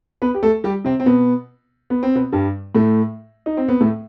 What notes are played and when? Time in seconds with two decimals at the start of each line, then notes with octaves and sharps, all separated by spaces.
0.22 B3 B4
0.34 G4
0.43 A3 A4
0.64 G3 G4
0.84 C3 C4
1.00 C4
1.06 B2 B3
1.90 B3
2.03 C4
2.15 B2 B3
2.32 G2 G3
2.75 A2 A3
3.46 D#4
3.57 C4
3.68 B3
3.81 A2 A3